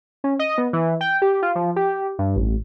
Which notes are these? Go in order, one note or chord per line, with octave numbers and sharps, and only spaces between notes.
C#4
D#5
B3
E3
G5
G4
F4
F3
G4
G2
A1